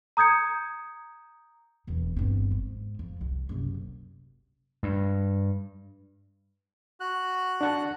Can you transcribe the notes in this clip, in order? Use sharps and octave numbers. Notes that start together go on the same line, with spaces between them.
A#5 D#6 G6 G#6 C#7
E1 E3
G1 C4
G#2
F2
C2
F#1 C3
G2
F#4 F#6
D4 F#5 A5